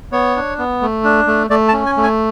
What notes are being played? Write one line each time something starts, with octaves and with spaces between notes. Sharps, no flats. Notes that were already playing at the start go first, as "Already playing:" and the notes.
B3 C#5
D4
B3
A3
D4
A3
A3 D5
A5
C#4
G#5
A3
G#5